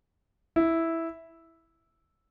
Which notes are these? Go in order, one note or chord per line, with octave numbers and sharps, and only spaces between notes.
E4